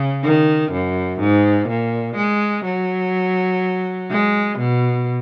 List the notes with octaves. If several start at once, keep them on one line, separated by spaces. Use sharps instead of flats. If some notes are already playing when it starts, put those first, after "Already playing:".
Already playing: C#3
D#3
F#2
G#2
A#2
G#3
F#3
G#3
B2